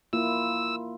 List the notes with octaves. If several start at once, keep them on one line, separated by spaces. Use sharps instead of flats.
A#3 E4 F4 E6